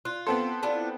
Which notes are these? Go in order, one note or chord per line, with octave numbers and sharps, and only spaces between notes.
F4 F#6
B3 C4 A4 C6
D4 E4 F4